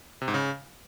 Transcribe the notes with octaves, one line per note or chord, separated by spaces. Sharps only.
C3
G#2
C#3